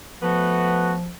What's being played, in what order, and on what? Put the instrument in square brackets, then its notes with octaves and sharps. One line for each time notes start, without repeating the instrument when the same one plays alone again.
[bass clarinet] F3 [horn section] A3 B3 F#4